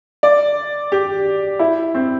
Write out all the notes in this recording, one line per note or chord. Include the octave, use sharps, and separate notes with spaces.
D5
G4
E4
C4